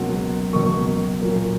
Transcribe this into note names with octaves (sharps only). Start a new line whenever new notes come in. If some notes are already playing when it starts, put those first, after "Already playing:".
Already playing: C#2 B2 F#3 A#3 F#5
C#2 B2 F#3 A#3 C#6
A#2 F#3 A#3